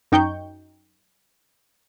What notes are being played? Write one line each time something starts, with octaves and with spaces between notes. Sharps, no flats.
F#2 D#4 G5 C#6 G6